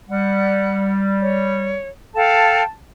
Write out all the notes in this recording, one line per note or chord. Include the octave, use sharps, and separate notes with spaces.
G3 F#5
C#5
A4 F5 G5 A5